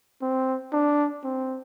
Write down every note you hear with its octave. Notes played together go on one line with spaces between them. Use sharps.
C4
D4
C4